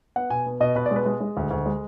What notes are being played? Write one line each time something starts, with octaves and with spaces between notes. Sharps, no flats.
B3 F#5
B2 G#5
B3
B2 D#5
B2 B4
D5
G#3
B4
G#3
G#3
D2
D2
G#3